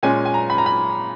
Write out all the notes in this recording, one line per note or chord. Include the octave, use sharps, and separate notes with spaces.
A#2 G#3 C#4 G#5
G#5
A#5
B5
A#5
B5